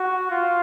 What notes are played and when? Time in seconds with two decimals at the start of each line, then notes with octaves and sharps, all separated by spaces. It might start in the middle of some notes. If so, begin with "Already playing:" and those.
Already playing: F#4
0.30 F4